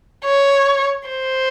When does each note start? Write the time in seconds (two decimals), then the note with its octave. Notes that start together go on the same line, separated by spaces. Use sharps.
0.24 C#5
1.09 C5